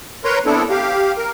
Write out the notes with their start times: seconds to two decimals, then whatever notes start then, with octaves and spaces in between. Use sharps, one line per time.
0.24 A#4 B4 C#5 A#5 C6
0.46 B3 C4 D4 E4 A4
0.70 G4 F5
1.17 A#4